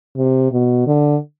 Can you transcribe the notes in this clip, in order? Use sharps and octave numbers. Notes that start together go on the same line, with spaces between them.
C3
B2
D3